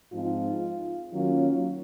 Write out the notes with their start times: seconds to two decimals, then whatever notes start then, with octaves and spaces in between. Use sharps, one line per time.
0.13 G#2 F3 C4 D#4 F4
1.13 D#3 F#3 A#3 C#4 F4